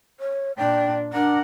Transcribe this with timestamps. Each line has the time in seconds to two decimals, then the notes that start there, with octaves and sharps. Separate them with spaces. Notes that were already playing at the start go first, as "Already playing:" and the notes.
0.20 C#5
0.57 A#2 D4 G5
1.13 D4 A#4 F#5